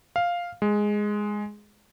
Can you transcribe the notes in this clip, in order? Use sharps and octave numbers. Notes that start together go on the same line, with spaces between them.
F5
G#3